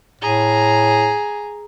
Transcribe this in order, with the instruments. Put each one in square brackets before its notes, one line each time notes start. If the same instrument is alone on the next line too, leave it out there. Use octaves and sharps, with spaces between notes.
[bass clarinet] A2 [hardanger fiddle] G#4 A#5